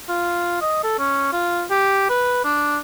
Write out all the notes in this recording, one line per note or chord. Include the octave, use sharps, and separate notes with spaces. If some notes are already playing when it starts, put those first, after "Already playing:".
F4
D#5
A4
C#4
F4
G4
B4
D4